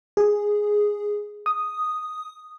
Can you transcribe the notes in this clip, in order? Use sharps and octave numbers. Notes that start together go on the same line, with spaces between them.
G#4
D#6